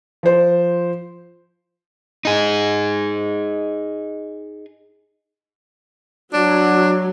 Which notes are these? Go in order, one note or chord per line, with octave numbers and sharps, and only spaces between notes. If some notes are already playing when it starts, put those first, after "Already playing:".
F3 C5
D#4 G#4
F#3 D4